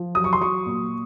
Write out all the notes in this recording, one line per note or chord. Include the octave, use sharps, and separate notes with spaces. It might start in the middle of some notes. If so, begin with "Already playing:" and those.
Already playing: F3
F#3 D#6
C#6
C6
F#3 C#6
A#2